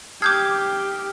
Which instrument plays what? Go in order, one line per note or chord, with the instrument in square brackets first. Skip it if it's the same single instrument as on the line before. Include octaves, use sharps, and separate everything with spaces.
[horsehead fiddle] G4 [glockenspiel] A5 F6 C7 [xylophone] D6 G6 G#6 [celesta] D#6